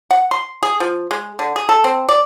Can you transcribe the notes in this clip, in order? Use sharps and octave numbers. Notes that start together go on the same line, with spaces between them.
F#5
C6
G#4
F3
G#3
D3
G#4
A4
C4
D5